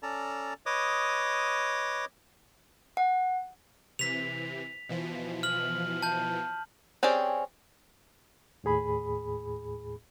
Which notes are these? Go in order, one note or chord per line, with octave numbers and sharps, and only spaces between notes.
C#4 A4 D5 A5 A#5
B4 C#5 D#5 D6 D#6
F#5
C3 E3 B6 F7
B2 E3 F3
F6 F#7
A5 G6
C4 C#4 G4 G#4 D5
D#2 A2 G#4 B5